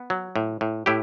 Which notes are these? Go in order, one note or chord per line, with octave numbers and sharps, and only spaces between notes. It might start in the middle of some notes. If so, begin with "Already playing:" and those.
Already playing: B3
F#3
A2
A2
A2 E4 G4